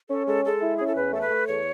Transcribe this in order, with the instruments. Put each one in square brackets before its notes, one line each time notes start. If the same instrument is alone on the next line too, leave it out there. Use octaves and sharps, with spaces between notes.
[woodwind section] C#4 [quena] A4
[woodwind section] G#3 [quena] A4
[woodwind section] G#3 [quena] A4
[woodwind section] E4
[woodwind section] C#4 [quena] G#4
[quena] A4
[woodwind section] E2 [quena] B4
[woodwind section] A3 [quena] A4
[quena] B4
[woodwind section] A3
[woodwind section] E2 [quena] C#5